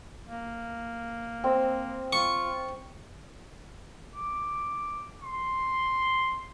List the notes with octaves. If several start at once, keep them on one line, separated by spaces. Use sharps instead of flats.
A#3
C4 E6
F4 C#6
D6
C6